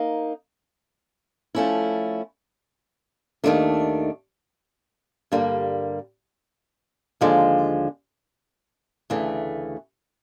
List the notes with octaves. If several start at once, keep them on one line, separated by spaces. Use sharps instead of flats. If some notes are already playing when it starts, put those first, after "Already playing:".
Already playing: A#3 D#4
F3 A3 C#4 E4
D#2 D#3 F#3 A3 D4
G2 D3 G3 A#3
D#2 D3 F3 G#3
D2 C#3 E3 A3